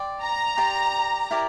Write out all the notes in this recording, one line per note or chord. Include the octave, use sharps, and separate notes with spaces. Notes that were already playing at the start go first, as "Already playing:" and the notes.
Already playing: D5 G5 C6
A#5
G4 D5 G5 C6
E4 G4 A#4 D5